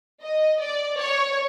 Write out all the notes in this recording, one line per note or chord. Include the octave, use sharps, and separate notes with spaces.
D#5
D5
C#5